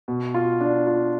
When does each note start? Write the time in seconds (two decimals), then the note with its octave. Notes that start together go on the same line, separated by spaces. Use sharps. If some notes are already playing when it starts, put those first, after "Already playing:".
0.08 B2
0.34 F4
0.61 D4
0.87 F4